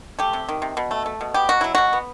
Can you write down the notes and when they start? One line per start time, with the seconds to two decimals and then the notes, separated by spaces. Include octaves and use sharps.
0.19 A3 G4
0.33 C3
0.49 D#3
0.62 C3
0.77 B2
0.91 A3
1.06 A3
1.21 B2
1.34 B3 G4
1.49 B2 F#4
1.61 F#3 E4
1.75 B2 F#4
1.93 B3